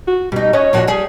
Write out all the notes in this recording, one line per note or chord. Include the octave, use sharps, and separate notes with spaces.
F#4
B2 G3 D#4
C#4 B4 C#5 D#5
A#2 F3 F#4
G3 G#4